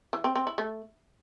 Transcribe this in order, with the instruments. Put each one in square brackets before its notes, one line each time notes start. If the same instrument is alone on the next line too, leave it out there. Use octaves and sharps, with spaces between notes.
[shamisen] E3
C4
C4
E4
A3